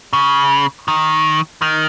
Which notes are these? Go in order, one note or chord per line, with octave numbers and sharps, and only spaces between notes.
C#3
D#3
D#3